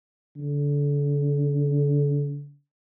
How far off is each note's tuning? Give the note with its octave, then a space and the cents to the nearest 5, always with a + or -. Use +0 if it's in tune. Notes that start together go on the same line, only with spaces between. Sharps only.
D3 -30